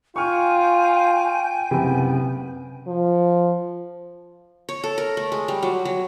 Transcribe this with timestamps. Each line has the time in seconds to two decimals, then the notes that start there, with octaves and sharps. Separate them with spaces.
0.16 F4 G5 G#5 C#6 F6 G6
1.71 F#1 C3 B3
2.87 F3
4.69 C#5
4.84 A4
4.98 A#4
5.17 A3
5.32 G#3
5.48 G3
5.63 F#3
5.85 F#3